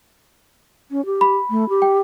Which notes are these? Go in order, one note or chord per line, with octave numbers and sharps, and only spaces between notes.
C#4
G4
B5
A3
G4
G5